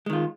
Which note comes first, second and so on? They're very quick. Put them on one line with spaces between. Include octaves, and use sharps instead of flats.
G#3 D#3 F4